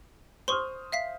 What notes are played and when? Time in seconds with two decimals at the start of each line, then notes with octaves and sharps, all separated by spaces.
0.48 C5 C6 C#6 D#6 F6
0.92 E5 F5 B6